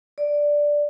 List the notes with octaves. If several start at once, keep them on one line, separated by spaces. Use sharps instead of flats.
D5